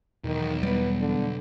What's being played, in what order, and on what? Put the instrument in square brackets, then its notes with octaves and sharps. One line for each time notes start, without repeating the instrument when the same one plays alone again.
[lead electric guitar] B1 [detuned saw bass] E2 [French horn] D#3
[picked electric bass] G3 B3 [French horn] B4
[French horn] D3